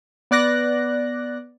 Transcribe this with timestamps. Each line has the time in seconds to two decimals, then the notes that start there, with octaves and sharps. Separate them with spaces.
0.31 B3 D5 F#6 A#6